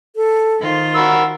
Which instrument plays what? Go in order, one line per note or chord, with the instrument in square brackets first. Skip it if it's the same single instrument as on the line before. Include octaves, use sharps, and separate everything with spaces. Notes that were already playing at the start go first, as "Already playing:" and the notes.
[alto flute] A4
[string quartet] D#3 F4 C5
[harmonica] F#4 A#4 E6 [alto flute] B5